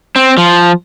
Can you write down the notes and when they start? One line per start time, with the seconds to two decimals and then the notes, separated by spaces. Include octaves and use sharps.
0.16 C4
0.38 F3